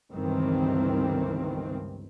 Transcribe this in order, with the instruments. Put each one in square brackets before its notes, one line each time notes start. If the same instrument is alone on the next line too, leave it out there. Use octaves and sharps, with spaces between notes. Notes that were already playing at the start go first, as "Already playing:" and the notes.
[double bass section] G1 C#2 G2 D#3 E3 C4